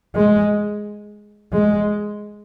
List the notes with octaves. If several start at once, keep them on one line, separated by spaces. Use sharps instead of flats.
G#3
G#3